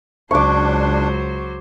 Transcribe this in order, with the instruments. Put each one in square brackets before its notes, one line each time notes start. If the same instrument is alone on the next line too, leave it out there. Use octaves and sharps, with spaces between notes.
[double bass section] C#2 [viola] F#3 C5 [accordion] D4 [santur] C#6 D6